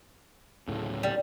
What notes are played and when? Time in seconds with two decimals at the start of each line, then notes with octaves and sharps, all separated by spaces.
0.68 D1 A2 C#3
1.03 G3